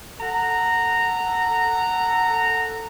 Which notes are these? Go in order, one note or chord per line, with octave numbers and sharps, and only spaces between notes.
A4 F#5 A#5